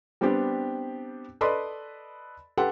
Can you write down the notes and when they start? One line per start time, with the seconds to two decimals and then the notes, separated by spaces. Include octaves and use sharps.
0.21 G3 B3 C4 D4 G4
1.41 A4 B4 D5 D#5 B5 C6
2.57 G4 A4 B4 F#5 C6